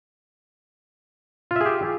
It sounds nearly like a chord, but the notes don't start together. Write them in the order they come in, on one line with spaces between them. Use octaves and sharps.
F4 E5 G#4 G4